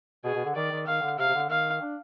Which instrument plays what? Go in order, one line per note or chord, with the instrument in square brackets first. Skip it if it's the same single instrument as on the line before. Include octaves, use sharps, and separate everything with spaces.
[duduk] B2 [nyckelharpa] G#4
[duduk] B2
D3
[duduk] D#3 [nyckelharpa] D5
[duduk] D#3
[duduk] D#3 [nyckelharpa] F5
[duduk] D3
[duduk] C3 [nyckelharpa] F5
[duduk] C3
D3
[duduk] D#3 [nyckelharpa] F5
[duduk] D4